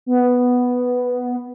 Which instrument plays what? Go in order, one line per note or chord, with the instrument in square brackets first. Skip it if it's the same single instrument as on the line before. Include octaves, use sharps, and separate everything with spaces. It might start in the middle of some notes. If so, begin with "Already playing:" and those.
[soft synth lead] B3